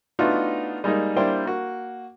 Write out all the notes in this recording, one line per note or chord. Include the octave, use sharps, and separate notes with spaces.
A3 B3 D4 D#4 F4 F#4
G3 G#3 A#3 D#4
G3 A#3 D4 E4 C5 G5
A#3 F#4